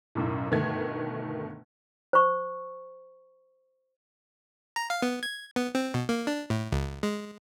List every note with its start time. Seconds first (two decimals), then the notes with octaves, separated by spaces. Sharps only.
0.15 B1 F#2 A2
0.51 G1 B2 D#3 A3 G#6
2.13 C5 C#6
4.76 A#5
4.90 F5
5.02 B3
5.23 G#6
5.56 B3
5.75 C4
5.94 B2
6.09 A#3
6.27 D4
6.50 A2
6.72 C#2
7.03 G#3